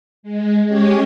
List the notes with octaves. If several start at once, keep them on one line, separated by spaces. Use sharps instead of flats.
G#3
G#3 C#4 G4 C#5